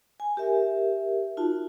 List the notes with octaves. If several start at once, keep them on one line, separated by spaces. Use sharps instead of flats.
G#5
G4 A#4 E5
D#4 F4 F#4 A5